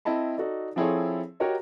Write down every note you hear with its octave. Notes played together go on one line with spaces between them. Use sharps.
C4 E4 D#5 A5 B5
D#4 F#4 A4 D5
F3 C4 E4 G#4 A4 C#5
F#4 G4 A#4 C#5 D#5